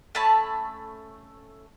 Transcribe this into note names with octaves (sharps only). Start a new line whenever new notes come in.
A3 C#4 A5 B5